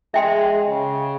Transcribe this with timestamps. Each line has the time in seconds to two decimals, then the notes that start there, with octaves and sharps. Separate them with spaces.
0.14 G#3 E5 G5 C6
0.67 C#3